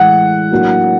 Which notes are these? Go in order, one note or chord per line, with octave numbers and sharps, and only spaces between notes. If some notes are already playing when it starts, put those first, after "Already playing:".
Already playing: A2 E3 G#3 F#5
A2 F#3 A#3 D4 F#4